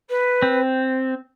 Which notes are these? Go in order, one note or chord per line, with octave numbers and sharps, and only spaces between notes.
B4
C4